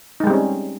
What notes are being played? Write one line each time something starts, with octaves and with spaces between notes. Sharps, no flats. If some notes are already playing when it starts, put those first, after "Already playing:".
G3 G#3 C4 C#4 D#4